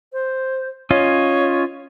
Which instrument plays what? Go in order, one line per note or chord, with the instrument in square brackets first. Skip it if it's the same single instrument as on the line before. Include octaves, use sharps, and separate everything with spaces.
[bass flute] C5
[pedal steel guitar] C#4 F4 D#5 [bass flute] C#5